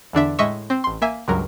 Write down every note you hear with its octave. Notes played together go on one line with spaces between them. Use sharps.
E2 D3 D4 E5
A2 G#3 D#5 E5 C#6 E6
C4
A1 C6
A#3 E5 G#5
C#2 G2 F#3 A#4